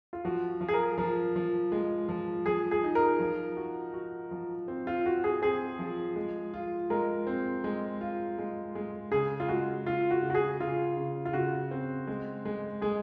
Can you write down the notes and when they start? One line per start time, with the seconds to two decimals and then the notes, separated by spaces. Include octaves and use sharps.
0.13 F4
0.25 F3 F#4
0.61 F3
0.68 G#4
0.74 A#4
0.98 F3 A#4
1.36 F3
1.72 G#3
2.09 F3
2.46 F3 G#4
2.71 G#4
2.84 D#4
2.95 A#4
3.20 F3
3.57 F#4
3.93 F#4
4.31 F3
4.68 C4
4.87 F4
5.06 C4 F#4
5.24 G#4
5.42 C4 G#4
5.79 F3
6.16 G#3
6.54 F4
6.90 G#3 A#4
7.27 C4
7.64 G#3
8.01 F4
8.39 G#3
8.75 G#3
9.11 C#3 G#4
9.40 F4
9.48 G#3 F#4
9.85 C#3 F4
10.11 F#4
10.22 C#3
10.30 F#4
10.35 G#4
10.60 C#3 F4
10.97 C#3
11.25 F4
11.33 C#3 F#4
11.71 C4
12.07 G#3
12.45 G#3
12.81 G#3 G#4